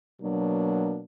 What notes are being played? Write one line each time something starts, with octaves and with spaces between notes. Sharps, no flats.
B2 F#3 A#3 D4